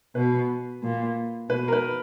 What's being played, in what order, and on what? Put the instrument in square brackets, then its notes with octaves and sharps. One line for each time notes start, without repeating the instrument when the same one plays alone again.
[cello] B2 [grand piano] B4
[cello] A#2
[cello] B2 [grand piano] B4
[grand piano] A#4
B4